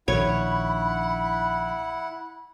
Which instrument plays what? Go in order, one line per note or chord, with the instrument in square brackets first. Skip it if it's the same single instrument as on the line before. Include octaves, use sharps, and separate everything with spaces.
[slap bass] A#1 D#3 [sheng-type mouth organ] E4 F#5 [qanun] C#5 [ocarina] B5